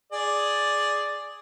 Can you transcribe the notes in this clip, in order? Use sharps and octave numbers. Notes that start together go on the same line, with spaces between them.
G#4 D5